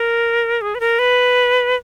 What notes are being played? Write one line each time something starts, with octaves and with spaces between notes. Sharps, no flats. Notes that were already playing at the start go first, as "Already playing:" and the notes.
Already playing: A#4
G#4
B4
A#4
B4